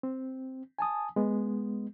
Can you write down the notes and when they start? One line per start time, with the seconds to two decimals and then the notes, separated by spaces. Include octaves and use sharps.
0.03 C4
0.79 G#5 A5 D#6
1.16 G#3 B3